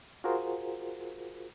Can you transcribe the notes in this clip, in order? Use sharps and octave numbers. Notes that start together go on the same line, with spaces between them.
F4 F#4 G#4 A#4 C5